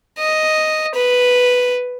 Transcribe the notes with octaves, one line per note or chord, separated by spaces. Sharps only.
D#5
B4